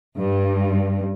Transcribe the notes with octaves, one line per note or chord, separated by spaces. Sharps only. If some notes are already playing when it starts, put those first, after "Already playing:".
G2